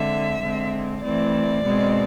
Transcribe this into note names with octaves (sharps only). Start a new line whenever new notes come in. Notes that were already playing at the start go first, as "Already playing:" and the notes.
Already playing: D3 G#3 C4 E5
D3 G#3 C4
E3 A3 C4 D5
B2 G#3 C4